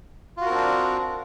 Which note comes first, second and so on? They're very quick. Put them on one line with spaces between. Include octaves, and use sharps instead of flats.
F4 F#4 A#4 C4 D4